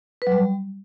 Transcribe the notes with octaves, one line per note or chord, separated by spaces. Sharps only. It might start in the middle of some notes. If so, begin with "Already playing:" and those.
B4
F#3
G3